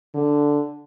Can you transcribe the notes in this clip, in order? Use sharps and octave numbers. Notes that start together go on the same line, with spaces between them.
D3